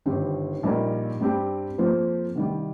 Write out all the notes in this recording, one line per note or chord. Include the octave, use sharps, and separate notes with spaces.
G1 G2 D#3 C4 G4
A#1 A#2 G3 D#4 A#4
G2 G3 C4 G4
F2 F3 A#3 F4 C5
C2 C3 D#3 G3